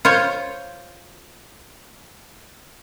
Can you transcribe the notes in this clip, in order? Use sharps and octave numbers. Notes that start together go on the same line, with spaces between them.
F4 C5 C#5